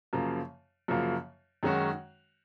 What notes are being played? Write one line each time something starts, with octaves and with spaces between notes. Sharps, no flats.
F#2 C#3 F3 A#3
F#2 C#3 F3 A#3
F#2 D#3 G#3 C#4 F#4